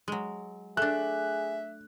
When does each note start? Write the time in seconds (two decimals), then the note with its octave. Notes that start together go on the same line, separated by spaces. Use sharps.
0.08 F#3 G#3
0.77 A3 D4 G#4 E5 F#6